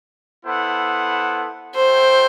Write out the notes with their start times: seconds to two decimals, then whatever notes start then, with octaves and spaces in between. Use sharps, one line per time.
0.44 B3 E4 A4 C5 F#5
1.75 F#4 A4 C5 E5 G5